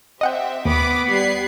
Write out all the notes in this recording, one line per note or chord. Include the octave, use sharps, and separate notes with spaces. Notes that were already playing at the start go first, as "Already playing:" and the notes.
C4 G4 D#5 E5 F#5 G5
D#2 B3 B5 D6 D#6
G3 F#6 G#6 C7